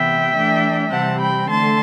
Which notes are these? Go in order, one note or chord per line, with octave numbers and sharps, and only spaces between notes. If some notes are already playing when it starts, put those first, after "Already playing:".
Already playing: C3 E3 B3 E5 G5
E3 A3 D4
C3 E3 G3 C4 F#5 A5
G5 B5
D3 A3 A5 C6